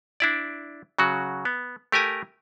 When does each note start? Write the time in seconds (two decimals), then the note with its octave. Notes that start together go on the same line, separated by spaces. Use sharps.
0.20 D4 E4 D5
0.99 C#3 F#3 F#4
1.45 B3
1.92 A3 G4 A#4 G#5 A#5